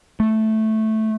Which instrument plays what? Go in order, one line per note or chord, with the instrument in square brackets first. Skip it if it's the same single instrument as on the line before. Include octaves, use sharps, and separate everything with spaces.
[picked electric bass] A3